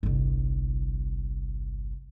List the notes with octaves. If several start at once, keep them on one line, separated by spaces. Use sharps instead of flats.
G1 C2